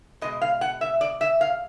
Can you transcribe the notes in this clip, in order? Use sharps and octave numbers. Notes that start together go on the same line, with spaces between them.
B2 G#3 D#5
F5
F#5
E5
D5
E5
F5